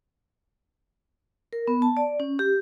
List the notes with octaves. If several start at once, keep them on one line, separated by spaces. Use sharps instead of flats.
A#4
B3
A5
D5
C#4
G4